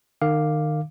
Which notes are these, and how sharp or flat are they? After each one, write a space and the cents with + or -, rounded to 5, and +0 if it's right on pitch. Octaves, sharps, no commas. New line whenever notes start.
D#3 -30 F5 +0 D6 +0